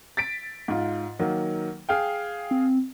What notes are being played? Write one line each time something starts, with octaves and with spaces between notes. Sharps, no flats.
A6 B6 D7
G#2 F4
D#3 F#3 A#3
G#4 F5 G5
C4